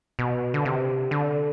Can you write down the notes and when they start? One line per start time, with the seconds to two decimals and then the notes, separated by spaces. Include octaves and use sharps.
0.19 B2
0.54 D3
0.65 C3
1.11 D3